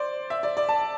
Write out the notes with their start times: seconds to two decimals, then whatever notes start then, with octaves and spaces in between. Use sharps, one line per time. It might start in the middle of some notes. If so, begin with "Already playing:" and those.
Already playing: C5 D5
0.30 E5
0.43 D5
0.57 D5
0.69 A5